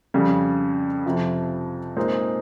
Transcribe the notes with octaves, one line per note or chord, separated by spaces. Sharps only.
F2 C#3 G3
F2 C3 F3
A#2 G#3 C4 D#4